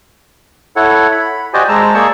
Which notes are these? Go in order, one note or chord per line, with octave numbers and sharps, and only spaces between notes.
E4 A4 C#5 F#5
B5
F#4 G4 C5 D5 D#5 G#5
G#3 C5 A5 A#5 E6
A#3 G#4 D5 C#6 E6